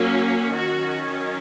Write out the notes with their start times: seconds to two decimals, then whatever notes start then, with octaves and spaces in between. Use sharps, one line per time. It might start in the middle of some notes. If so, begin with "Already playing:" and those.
Already playing: F#3 A#3 C#4
0.52 D#3 F#3 C#4 F#4